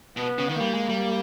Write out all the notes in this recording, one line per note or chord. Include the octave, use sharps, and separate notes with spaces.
B2 B3
C#3
D#3
G3 A#3
G#3
G3